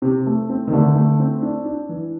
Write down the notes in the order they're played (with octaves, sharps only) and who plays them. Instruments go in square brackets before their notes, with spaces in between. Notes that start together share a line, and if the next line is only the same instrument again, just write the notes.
[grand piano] C3 [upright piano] C4
[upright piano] A3
C4
[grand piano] D#3
[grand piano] D3 [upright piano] A3
[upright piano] A3
C4
D4
D4
E3